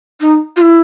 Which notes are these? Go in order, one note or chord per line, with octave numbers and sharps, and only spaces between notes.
D#4
F4
E4